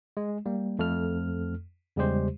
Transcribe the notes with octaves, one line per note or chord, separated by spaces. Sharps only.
G#3
G3 A#3
F2 A3 A4 F6
E2 C#3 G3 G#3 G4 C5